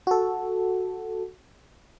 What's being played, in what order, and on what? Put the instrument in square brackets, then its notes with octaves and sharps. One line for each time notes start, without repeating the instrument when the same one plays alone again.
[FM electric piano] F#4 A4